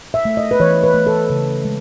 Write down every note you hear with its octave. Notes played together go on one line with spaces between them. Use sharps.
E5
A3
D#5
B4
E3 C#5
B4
A3
A4
C#3
G#3